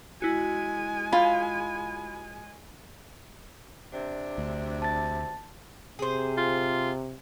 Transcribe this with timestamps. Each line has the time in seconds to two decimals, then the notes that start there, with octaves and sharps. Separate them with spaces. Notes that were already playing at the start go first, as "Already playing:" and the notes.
0.22 G#3 E4 F#4 G#5
1.13 F4 F5 B5
3.93 C3 D4
4.38 D2
4.82 A5 A6
5.99 C3 G#4 C5
6.37 F4